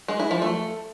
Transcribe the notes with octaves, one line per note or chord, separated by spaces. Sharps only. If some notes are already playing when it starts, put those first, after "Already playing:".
G#3
E4
F3
A3